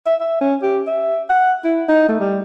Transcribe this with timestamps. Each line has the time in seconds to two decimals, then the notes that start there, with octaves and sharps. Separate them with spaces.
0.06 E5
0.21 E5
0.41 C#4
0.62 G4
0.87 E5
1.29 F#5
1.64 E4
1.89 D#4
2.09 A3
2.20 G3